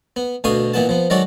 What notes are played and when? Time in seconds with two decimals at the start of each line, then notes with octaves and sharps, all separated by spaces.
0.16 B3
0.44 D2 B2 D3 F5 C#6 D#6
0.74 A#2 E3 B3 F#5 A5
0.89 F3 B3
1.10 D#3 F#3 G#3 F#4 A4 D5